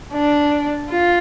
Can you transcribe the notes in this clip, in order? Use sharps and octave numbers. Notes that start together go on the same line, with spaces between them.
D4
F4